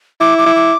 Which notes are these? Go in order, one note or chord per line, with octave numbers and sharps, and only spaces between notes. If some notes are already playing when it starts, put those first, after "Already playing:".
E4 D6
D6
E4
D6